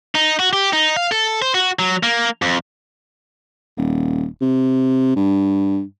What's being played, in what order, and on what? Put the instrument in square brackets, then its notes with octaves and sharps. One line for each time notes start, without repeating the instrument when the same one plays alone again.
[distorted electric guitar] D#4
F#4
G4
D#4
F5
A4
C5
F#4
F#3
A#3
F2
[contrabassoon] D#1
C3
G2